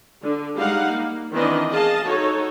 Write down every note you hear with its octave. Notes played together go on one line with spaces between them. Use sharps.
D3
G3 G#3 D#4 F5 F#5
A#3
D#3 E3 B3 C4 D4 D#5
G#4 D#5 F5 A5
D#4 F#4 A4 C#5